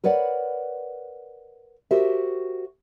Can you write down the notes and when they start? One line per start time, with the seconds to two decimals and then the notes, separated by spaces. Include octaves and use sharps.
0.04 A#4 B4 C#5 D5 F#5
1.91 F#4 G4 A#4 C5 E5